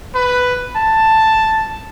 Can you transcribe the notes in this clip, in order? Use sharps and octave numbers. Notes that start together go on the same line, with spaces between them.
B4
A5